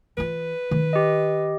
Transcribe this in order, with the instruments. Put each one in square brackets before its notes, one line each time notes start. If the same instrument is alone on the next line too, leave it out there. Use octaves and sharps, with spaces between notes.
[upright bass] E3 F4 [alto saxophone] B4
[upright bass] D#3
[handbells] G4 D#5